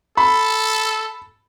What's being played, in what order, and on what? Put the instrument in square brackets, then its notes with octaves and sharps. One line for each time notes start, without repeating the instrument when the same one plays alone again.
[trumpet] A4 [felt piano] B5